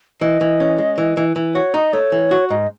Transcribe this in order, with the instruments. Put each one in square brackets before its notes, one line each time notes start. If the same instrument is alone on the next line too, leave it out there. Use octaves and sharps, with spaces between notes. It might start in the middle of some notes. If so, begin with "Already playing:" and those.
[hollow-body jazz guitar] E3 [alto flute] D#5
[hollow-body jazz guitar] E3
C#4
G#3
E3
E3
E3
[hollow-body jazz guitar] F#4 [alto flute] C#5
[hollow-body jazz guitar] D#4 [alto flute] D#5
[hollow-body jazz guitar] A3 [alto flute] C#5
[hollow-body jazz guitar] E3
F#4
[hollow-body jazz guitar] G#2 [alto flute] D#5